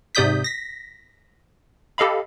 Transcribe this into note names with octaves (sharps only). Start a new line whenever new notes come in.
G#2 C3 D5 D#6 G6 B6
A#6 B6
G4 A4 D#5 F5 B5